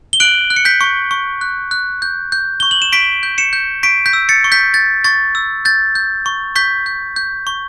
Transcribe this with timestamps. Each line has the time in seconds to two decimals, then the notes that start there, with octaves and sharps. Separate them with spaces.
0.13 G7
0.20 F#6 D7 F#7
0.50 F#6
0.56 C#7
0.65 G6 B6
0.81 C#6
1.11 C#6
1.41 F#6
1.71 F#6
2.02 G6
2.32 G6
2.60 C#6 G7
2.71 F#7
2.82 E7
2.92 C#6 B6 D7
3.23 G6
3.38 C#7 E7
3.53 G6
3.83 C#6 B6 D7
4.06 G6 B6
4.13 E6
4.29 A6 C#7
4.44 C#6
4.52 G6 B6
4.74 G6 A6
5.04 C#6 A6
5.35 E6
5.65 G6 A6
5.95 G6
6.26 C#6
6.55 C#6 G6 B6
6.86 G6
7.16 G6
7.47 C#6